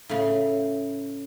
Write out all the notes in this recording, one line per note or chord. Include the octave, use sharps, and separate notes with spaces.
A2 C#3